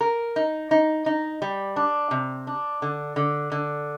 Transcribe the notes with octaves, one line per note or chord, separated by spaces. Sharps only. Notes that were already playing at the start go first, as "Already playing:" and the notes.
A#4
D#4
D#4
D#4
G3
D4
C3
D4
D3
D3
D3